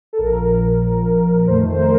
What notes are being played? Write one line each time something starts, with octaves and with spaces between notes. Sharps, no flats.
A4
A#1 A#2 F3 A#4
F2 D#3 A3 C5
C5
A#4